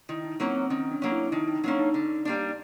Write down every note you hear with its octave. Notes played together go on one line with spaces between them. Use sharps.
D#3 E4
D#4
F#3 A#3 C4 C#4
C4
D#3 C#4
D4
F#3 A#3 C#4
E4
D#3 D#4
D#4
F#3 A#3 C#4 D4
D#4
D3
G3 A#3 D4